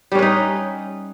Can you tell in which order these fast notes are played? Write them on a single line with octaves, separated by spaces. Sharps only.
G3 C#4 B4 D#4